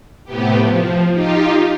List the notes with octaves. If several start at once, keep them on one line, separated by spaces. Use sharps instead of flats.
A2 C3 B3 G4
F3
D#4 F4 G4